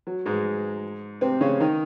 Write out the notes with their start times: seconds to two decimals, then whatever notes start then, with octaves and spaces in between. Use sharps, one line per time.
0.07 F#3
0.26 G#2 G#3
1.21 C3 C4
1.41 C#3 C#4
1.60 D#3 D#4